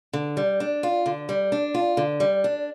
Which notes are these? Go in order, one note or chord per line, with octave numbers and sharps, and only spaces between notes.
D3
G3
D4
F4
D3
G3
D4
F4
D3
G3
D4